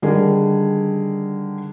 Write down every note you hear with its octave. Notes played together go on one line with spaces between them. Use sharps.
D3 D#3 G3 G#4 A#4